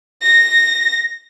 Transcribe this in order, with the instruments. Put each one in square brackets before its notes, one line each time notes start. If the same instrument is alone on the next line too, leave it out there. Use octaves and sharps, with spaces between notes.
[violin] A#6